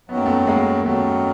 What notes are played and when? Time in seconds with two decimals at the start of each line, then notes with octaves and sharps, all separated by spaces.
0.09 F#2 D#3 F#3 B3
0.17 A#3
0.26 A3 B3
0.47 G#3 A#3
0.85 F#2 D#3 F#3 A3 B3